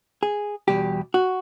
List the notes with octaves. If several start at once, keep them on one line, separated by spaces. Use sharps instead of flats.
G#4
E2 B2 G3 G4
F#4